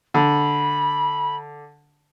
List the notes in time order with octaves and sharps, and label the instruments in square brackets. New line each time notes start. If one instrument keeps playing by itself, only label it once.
[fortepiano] D3 [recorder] B5